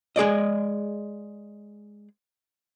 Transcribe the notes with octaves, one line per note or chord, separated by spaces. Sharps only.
G#3 G#4 D5 D#5